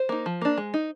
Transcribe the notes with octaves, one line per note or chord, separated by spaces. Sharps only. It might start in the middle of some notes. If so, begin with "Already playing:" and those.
Already playing: C5
A#3 D#4
F3
A#3 D4
G#3
D#4